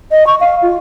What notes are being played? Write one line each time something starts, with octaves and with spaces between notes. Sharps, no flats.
D#5
C#6
F5
F4